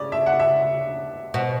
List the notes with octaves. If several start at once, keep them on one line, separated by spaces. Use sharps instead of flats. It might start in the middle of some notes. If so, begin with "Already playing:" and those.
Already playing: C#3 D5
E5
F#5
E5
B2 F#5